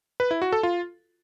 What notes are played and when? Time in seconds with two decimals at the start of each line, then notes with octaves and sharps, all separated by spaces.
0.20 B4
0.31 E4
0.42 F#4
0.52 A4
0.63 F4